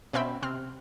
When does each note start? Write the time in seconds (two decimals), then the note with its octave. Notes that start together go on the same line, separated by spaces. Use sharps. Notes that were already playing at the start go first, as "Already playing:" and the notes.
0.13 B2 C4 C#4 E5 G5 B5
0.42 C3 C4 F6